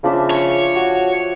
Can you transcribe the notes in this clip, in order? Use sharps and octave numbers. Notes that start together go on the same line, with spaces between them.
C#3 F3 D4 E5
C#5
F#4